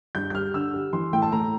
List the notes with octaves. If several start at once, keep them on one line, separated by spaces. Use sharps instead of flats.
G2 G6
G6
G3 F6
D3 E6
G3
E3 C6
A2 G5
A5
A2 A#5